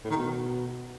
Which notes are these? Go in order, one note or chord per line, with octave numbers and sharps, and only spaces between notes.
A2
D#3
B2